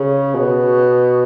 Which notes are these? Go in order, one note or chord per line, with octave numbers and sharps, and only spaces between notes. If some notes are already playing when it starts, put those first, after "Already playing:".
Already playing: C#3
B2